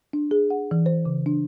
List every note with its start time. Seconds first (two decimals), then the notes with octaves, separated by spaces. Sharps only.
0.13 D4
0.31 G#4
0.50 F#5
0.71 E3
0.86 C5
1.05 C#3
1.26 D4